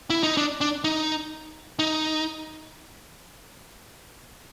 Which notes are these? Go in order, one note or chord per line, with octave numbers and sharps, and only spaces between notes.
E4
D#4
D4
D4
D#4
D#4